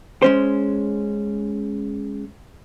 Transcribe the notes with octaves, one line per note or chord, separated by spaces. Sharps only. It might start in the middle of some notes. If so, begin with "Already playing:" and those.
G#3 C#4 C5